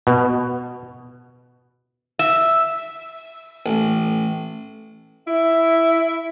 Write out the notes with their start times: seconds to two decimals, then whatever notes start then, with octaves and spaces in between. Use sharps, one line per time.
0.07 B2
2.19 E5
3.66 A1
5.27 E4 E5